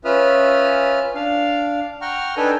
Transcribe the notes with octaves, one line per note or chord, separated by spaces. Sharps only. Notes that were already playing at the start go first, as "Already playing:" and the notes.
C#4 F4 B4 E5 D#6 F6
D4 F5
F#5 G5 A#5 C#6 F6
D4 D#4 A4 B4 G5 G#5